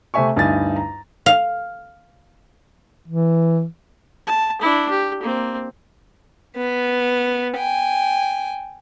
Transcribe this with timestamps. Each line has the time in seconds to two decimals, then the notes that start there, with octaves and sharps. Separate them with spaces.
0.14 C3 A3 C4 E5 G#5 C#6
0.36 D2 G2 D#4 E4 G#5 A6
0.76 A#5
1.26 F5
3.08 E3
4.27 A5
4.61 D4 E4
4.90 G4
5.22 A#3 C4
6.56 B3
7.56 G5 G#5